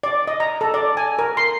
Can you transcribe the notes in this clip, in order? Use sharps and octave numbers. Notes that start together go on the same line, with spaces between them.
D5
D#5
A#5
A4
D5
G#5
A#4
C6